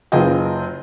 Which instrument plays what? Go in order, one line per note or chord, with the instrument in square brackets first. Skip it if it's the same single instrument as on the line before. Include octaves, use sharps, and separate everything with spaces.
[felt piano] F#1 F4 G#4 B4 D#5 G5